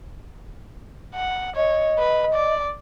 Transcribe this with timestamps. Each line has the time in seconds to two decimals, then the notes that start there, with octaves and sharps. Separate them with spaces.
1.15 F#5
1.56 C#5 D#5
1.99 B4
2.35 D5